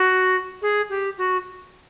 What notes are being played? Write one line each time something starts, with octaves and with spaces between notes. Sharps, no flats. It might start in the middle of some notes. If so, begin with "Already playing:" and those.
Already playing: F#4
G#4
G4
F#4